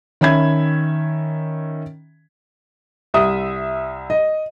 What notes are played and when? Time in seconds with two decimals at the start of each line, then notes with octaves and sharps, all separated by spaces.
0.21 D#3 C#4 E5 B5 G#6
3.14 C2 E5 D#6
4.10 D#5